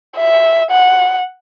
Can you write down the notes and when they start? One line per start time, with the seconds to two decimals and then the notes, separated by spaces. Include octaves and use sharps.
0.17 E5
0.71 F#5